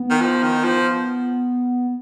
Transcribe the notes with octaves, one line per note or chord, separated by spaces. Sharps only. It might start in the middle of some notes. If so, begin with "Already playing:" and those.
Already playing: B3
D#3
F3
D#3
F3